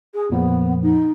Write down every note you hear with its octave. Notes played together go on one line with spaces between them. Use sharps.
G#4
F2 A#2 F3 B3
D#4